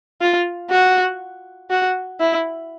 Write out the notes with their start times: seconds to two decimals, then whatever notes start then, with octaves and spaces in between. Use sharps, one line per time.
0.21 F4
0.71 F#4
1.70 F#4
2.20 E4